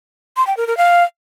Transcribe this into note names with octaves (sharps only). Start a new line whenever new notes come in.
C6
G5
A#4
A#4
F5